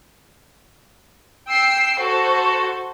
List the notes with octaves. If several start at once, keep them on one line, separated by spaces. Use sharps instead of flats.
G5 E6 C7
F#4 A4 C5